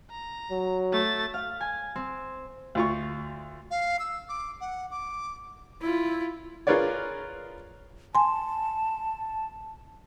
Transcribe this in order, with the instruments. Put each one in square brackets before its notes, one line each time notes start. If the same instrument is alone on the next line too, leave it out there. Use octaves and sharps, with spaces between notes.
[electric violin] A#5
[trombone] F#3
[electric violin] A3 A6
[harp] F5
G#5
C4
[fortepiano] D2 F4 C#6
[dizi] F5
E6
D6
F#5
D6
[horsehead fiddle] E4 F4
[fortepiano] F4 G#4 A#4 B4 C#5 D5
[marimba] G#5 C6 [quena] A5